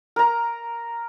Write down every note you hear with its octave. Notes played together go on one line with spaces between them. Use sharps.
A#4 A#5